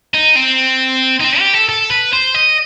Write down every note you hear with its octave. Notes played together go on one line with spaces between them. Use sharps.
D#4
C4
D#4
C4
G4
A4
A4
B4
C5
D#5